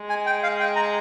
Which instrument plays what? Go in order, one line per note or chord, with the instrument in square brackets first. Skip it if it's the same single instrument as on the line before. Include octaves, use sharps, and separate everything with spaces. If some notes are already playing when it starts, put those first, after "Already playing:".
Already playing: [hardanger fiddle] G#3
[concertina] G#5
G5
F5
G5
A#5